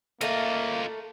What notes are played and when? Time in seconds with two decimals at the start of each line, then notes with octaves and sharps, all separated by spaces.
0.21 A3 A#3 F4 D#5